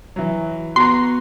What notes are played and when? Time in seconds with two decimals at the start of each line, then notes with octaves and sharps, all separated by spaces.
0.16 E3 F#3
0.76 B3 F#4 A#5 C6